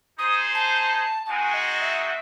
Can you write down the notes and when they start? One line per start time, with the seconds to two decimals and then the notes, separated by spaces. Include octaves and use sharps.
0.18 D#4 G#4 C5 D#6
0.55 A5
1.26 G#3 C4 D#4 F#4 G#5 A5
1.54 D#5
1.81 E5